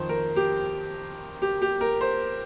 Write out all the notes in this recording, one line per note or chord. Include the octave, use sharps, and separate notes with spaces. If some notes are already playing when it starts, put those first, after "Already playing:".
Already playing: F2 D#3 C5
A#4
G4
G4
G4
A#4
C5